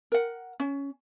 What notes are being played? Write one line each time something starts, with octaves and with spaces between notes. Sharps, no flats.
A#4 F#5
C#4